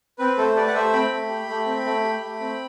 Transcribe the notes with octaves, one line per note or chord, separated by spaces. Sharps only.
C4 B4
A3 A4 C5
G4 B4 D5
F#5
A3 C5 E5
C4 G5 B5
A3
G4
A3
C4
A3
G4
A3
C4